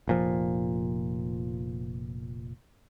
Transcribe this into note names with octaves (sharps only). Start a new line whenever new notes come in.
F1 A#2 F3